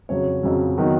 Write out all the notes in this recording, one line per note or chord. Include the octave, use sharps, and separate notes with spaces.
F2 C#3 F#3 C#5
F2 C#3 F#3
D#3 F#3 B3 D#4